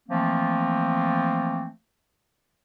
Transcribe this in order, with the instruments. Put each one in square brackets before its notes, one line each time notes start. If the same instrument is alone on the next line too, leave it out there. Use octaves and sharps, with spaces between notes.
[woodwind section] E3 F3 A3 A#3 C4